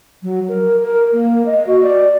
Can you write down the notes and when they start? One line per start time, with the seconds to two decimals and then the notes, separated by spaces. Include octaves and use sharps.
0.23 F#3
0.48 A#4
0.84 A#4
1.13 A#3
1.46 D#5
1.67 F#4
1.83 D5